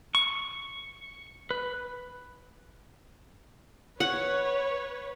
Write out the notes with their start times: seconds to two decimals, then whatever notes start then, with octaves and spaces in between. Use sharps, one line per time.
0.15 C#6
1.51 B4
4.00 B4 C#5 F#5